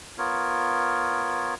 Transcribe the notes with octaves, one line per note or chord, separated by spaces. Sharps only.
B3 F4 A#4 C#5